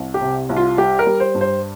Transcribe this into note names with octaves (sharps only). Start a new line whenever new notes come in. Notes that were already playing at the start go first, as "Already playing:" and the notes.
Already playing: C2
G4
C3
C2
F4
G3 G4
A#4
G3
C5
G2
C5